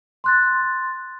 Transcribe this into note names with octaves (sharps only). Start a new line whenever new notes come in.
C6 F#6 A6